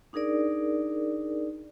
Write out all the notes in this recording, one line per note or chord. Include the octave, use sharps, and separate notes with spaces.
D4 D#4 G#4 A#4 D5